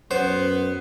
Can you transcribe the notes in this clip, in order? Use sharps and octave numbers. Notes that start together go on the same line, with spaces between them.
F#2 B3 C5